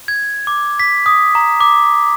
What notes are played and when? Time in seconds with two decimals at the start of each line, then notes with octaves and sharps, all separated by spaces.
0.08 G#6
0.47 D6
0.80 B6
1.06 D#6
1.35 A#5
1.60 D6